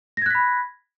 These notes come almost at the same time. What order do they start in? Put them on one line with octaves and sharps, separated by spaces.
A#6 G#6 F#6 B6 B5